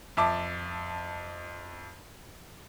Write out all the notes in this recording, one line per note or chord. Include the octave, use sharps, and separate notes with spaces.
F2 E5 A5 D6